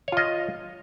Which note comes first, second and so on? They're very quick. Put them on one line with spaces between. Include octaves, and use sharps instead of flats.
C#5 F4 D#5